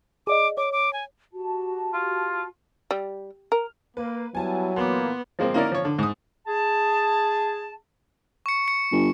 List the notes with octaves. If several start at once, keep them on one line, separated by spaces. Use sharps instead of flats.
G#4 D5 D#5 D6
C#5 D6
D6
G#5
F#4 G4 A5
F4
G3
A#4
A#3 B4
F#3 G3 B3 E4 G#5 A5
A#2 E3 A#3 B3 C6 D6
F3 G#3 A#3 C4
A#3 C#4 D#4 E4 A#4 D5
F3 C#5
D3
G#2 D#6
G#4 A5
C#6 C#7
C#7
G1